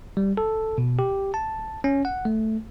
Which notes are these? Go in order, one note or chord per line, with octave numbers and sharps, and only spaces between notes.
G3
A4
B2
G4
A5
C#4
F#5
A3